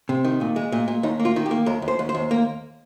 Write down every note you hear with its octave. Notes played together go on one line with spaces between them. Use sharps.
C3
D#3
A#2
G#3
A#2
A#2
D#2 D#4
A#3
F4
D#3
G4
A#3
D#2 A#4
D#2
C5
D#2
C5
D#2
A#3